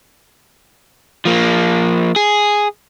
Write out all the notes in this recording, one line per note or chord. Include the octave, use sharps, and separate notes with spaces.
F3 A#3
G#4